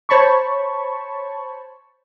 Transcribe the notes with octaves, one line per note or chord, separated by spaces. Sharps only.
C5 C#5 A5 B5 C#6